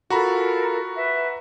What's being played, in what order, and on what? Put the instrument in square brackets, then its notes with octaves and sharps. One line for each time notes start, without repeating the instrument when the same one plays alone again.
[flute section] F4 A4 A#4 [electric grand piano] F#4 A#5 B5
[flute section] B4 E5